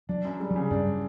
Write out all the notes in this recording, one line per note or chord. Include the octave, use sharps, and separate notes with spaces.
F#3 D4
F#2
G3
F#3
C#3
G2 D4